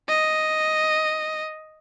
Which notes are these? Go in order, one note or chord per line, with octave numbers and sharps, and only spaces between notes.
D#5